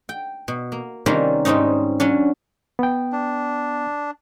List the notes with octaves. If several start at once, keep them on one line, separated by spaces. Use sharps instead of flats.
G5
B2
A#3
C3 D#3 G3 A#3 C#4 F4
G#2 G3 C4 C#4 D#4
F#3 C#4 D4
B3 G5
D4